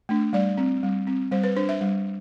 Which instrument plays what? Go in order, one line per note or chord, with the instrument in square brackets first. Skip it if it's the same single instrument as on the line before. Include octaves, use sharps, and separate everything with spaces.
[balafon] A3 D4
G3 D5
C4
G3
C4
G3 C5
B4
D4 C5
E5
G3